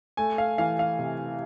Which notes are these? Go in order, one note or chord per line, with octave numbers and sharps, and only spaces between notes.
A3 G#5
F5
E3 F5
F5
C3